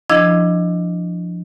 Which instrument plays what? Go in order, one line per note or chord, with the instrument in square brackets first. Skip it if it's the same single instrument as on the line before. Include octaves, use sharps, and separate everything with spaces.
[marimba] F3 D4 E4 D#5 G#6